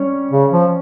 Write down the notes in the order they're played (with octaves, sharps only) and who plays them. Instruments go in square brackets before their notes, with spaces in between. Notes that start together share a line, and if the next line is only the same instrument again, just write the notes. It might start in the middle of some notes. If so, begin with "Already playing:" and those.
Already playing: [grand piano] G3 C#4 C#5
[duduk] C#3
F3